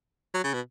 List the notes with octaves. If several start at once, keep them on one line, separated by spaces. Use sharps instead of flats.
F#3
C#3
B2